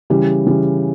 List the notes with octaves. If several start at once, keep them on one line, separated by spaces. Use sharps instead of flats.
C#3 E3 G3
C#3 E3 G3